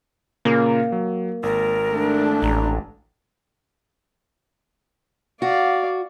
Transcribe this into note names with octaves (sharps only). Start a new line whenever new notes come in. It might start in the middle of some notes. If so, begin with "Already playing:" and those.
A#2 C#3 A#3 A#4
F#3
G#1 A#4
A3 D4
A1 A#5
F#4 D5 F5